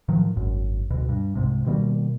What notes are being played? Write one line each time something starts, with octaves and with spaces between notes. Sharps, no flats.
A2 D#3 F3 F#3
G#1 F#2
D#1 D2 B2
G2
C2 G#2 C3
B2 D#3 G3 A#3